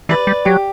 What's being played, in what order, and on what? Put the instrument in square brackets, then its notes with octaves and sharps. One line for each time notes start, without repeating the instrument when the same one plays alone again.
[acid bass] E3 [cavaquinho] B4 D5
[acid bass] G3
[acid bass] F#3 [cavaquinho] G4